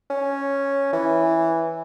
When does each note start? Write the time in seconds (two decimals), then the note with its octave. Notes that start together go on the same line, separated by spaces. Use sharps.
0.10 C#4
0.93 E3